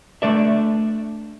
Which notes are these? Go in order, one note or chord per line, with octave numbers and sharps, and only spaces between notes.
A3 D4 D5 E5